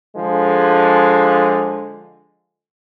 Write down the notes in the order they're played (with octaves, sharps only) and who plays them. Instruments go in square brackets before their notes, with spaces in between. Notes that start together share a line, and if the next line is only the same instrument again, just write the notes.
[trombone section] D3 F3 G#3